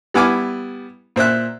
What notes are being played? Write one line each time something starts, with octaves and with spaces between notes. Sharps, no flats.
G3 B3 E4 G#5 D6 F6
A#2 C5 E5 F#6